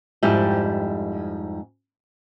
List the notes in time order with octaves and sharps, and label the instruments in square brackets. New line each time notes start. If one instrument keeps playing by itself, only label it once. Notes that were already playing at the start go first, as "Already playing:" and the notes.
[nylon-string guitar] F2 G#2 G3 E4 G4